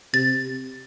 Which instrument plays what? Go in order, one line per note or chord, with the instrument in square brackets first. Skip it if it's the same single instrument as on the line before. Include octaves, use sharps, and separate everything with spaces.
[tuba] C3 [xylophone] A6